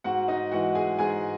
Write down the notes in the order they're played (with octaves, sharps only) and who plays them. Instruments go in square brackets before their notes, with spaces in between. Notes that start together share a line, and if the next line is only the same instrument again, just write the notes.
[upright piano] G#2 F#4 F#5
D#4 D#5
E3 G#3 F#4 F#5
G#4 G#5
G#2 G#4 G#5